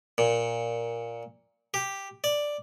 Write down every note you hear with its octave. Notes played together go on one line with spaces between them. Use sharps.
A#2
G4
D5